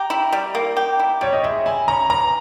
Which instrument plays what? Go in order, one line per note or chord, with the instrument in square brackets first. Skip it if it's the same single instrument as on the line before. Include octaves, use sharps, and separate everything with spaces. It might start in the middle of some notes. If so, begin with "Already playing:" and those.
Already playing: [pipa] G4 [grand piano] A#5
[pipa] E4
G3
A#3
G4
E4
[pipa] G3 [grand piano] C#5
[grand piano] D#5
[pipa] G#3 [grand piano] E5
[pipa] E4 [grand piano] G#5
[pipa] C#4 [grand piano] A#5
[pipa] E3 [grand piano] A#5